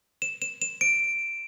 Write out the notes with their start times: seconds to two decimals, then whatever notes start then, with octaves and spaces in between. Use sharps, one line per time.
0.22 E7
0.42 E7
0.62 E7
0.81 D7